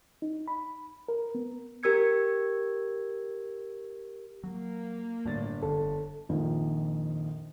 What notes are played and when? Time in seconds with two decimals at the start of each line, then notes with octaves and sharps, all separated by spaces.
0.22 D#4
0.48 B5
1.09 A#4
1.35 B3
1.83 G4 A#4 E6 G#6 C#7
4.44 F#3 A#3
5.25 G1 A2 D4 A6
5.63 F1 A2 D3 A4
6.29 A#1 F2 D#3